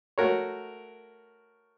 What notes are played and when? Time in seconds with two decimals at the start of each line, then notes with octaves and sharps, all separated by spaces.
0.18 A3 F#4 A#4 C#5